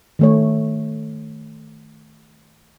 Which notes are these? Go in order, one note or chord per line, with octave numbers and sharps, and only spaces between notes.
D#3 A3 C#5